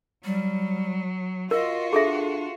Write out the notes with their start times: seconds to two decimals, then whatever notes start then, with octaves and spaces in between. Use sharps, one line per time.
0.24 F#3 G3
1.51 F4 F#4 A#4 D#5
1.93 D4 G#4 A4 E5